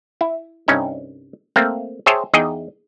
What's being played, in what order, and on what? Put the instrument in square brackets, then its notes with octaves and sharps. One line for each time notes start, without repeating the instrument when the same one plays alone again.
[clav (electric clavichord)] E4
C2 G2 C#4 D#4 G5
A3 A#3 C4
G#4 C5 C#5 E5 G5 A5
E2 D#4 G#4 D#5 G5